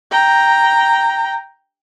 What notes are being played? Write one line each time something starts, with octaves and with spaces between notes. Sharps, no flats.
G5 A#5